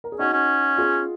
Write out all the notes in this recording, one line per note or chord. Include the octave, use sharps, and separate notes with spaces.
A#4
G#4
C#4 D#4 F#4
C#4
F4 G#4